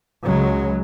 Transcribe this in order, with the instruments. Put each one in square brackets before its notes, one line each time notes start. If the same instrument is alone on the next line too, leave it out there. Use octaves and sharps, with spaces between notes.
[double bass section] C#2 C#3 F#3 G#3